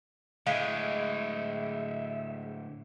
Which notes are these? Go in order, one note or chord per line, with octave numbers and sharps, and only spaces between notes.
A2 D3 G#3 E5 F5